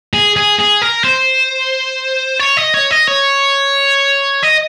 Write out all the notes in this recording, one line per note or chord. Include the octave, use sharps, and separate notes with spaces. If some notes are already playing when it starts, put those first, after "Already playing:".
G#4
G#4
G#4
A#4
C5
C#5
D#5
C#5
D#5
C#5
D#5